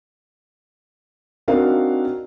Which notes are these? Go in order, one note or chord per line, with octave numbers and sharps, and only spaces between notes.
C4 D4 D#4 F#4 A#4 F5